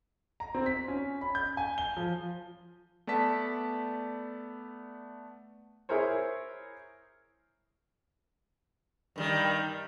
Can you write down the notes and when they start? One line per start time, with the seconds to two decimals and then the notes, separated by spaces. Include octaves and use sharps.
0.40 A#5
0.55 C4
0.66 B6
0.88 C#4
1.21 B5
1.35 G6
1.57 G#5
1.78 G7
1.97 F3
3.07 A3 B3 D5 A5 B6
5.89 E4 G#4 A#4 C5 C#5
9.16 G2 D#3 G3